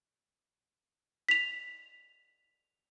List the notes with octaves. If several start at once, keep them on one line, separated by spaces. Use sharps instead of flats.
B6 F7